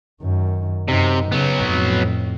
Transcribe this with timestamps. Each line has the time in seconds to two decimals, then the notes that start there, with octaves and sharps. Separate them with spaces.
0.21 F#2 D#3
0.88 F#2 C3 D#4
1.32 C#3 F#3 B3
1.66 F2 A2